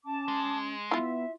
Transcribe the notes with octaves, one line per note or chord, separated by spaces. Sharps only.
C#4 A5 D6
G#3
B3 E4 F4 E5